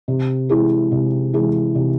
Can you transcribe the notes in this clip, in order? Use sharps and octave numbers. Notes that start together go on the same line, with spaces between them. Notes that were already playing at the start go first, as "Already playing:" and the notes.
C3
E3 G#3 E4 G#4
C3
E3 G#3 E4 G#4
C3